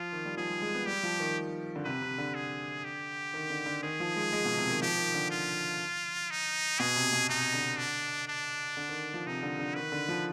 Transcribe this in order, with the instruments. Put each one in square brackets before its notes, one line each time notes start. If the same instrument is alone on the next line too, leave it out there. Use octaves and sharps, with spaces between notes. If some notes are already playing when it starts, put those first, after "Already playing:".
Already playing: [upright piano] F3 [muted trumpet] F4
[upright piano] D#3
G3
[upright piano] F3 [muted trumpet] G#4
[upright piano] G3
G#3
B3
[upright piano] G3 [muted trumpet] G4
[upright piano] F3
D#3
D3
[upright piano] C3 [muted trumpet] B4
[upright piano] C3
D3
[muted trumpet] G#4
G4
[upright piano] D#3
D3
D3
[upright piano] D#3 [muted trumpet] G#4
[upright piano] F3
G#3
G#3
B2
C3
D#3
[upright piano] F3 [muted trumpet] G4
[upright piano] D#3
D3
[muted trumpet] F4
D#4
[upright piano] B2 [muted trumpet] G#4
[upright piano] C3
B2
[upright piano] C3 [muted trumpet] D#4
[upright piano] D3
[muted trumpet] D4
D4
[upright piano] D3
D#3
F3
[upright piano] C3 [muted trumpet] D#4
[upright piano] D3
D3
[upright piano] D#3 [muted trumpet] B4
[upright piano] D3
F3